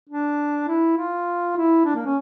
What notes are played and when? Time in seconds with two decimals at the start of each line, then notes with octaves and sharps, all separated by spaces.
0.09 D4
0.68 E4
0.98 F4
1.57 E4
1.85 D4
1.95 A#3
2.06 C#4